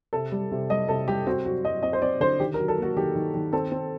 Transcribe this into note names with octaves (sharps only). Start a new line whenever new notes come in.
C3 A4
G3
C3
G3 D#5
C3 A4
G3 G4
C4 F#4
F#3 F#4
F#3 D#5
C4 D#5
C5
C4 D5
D3 C5
D#3 G4
A#4
F#3
A4
A#3 F#4
D#3 G4
D#3
D#3
C4 A4
C4